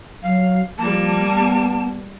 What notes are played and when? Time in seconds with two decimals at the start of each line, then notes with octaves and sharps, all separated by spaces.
0.23 F#3 F5
0.78 F3 G3 A#3 A5
1.33 B3